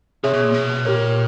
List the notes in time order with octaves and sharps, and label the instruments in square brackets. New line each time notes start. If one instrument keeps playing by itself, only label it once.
[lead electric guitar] C3 [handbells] G#4 C#5 E5
[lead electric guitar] B2
A#2
B2
[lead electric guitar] A#2 [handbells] G4 A#4 C#5